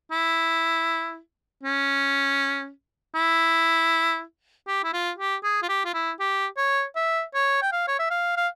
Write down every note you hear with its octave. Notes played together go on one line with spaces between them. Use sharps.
E4
C#4
E4
G4
E4
F4
G4
G#4
F4
G4
F4
E4
G4
C#5
E5
C#5
G5
F5
C#5
E5
F5
F5